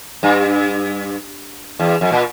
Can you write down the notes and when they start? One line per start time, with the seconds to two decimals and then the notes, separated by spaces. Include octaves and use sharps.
0.23 G2
1.80 E2
2.01 F2
2.12 A#2